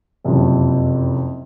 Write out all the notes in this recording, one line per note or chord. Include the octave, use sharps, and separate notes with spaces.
F#1 F2 C3